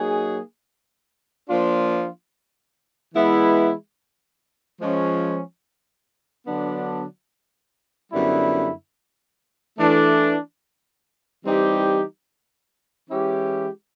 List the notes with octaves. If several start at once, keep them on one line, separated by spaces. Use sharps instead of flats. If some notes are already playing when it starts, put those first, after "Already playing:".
Already playing: F#3 A#3 D#4 G#4
F3 A#3 D4 F4
E3 G#3 B3 E4
F3 G#3 C#4
D3 F#3 B3 D4
F#2 D3 G3 B3 E4
E3 A3 D4
E3 G3 C4 D#4 G4
E3 G#3 C#4 E4 G4